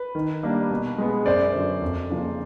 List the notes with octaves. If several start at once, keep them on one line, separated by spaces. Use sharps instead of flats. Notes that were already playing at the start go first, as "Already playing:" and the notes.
Already playing: B4
D#3
G3 A#3 D4
B2
G#3 B3
F#2 C5 D5
D3 F#3
F2
C#3 F3 A#3